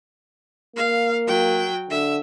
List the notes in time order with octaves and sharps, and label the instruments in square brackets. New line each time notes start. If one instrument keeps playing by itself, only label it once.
[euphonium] A#3 [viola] F5
[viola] F#3 G5
[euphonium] D3 [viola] E5